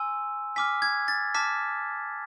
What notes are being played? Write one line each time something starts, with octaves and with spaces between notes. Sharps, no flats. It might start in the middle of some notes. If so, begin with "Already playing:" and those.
Already playing: G#5 C6 E6
G#5 D6 F6 B6
G#6
A6
A5 D6 F6 B6